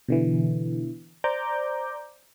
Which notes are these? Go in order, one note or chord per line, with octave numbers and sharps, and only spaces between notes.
B2 D3 E3
C5 D5 A#5 D6 G6